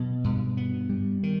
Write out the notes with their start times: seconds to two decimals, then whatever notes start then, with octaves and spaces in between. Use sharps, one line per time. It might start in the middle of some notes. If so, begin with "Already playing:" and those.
Already playing: B2 F#3
0.24 G2
0.57 B3
0.89 G3
1.23 D#3